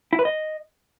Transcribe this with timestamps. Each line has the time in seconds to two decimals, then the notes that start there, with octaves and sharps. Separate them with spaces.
0.13 E4
0.19 B4
0.25 D#5